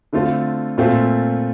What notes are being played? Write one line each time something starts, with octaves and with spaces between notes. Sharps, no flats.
D3 A3 C4 F4 A4
A#2 A3 C4 F4 A4